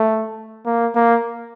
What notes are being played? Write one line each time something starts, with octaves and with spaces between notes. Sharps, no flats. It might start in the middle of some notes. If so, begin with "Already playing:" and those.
Already playing: A3
A#3
A#3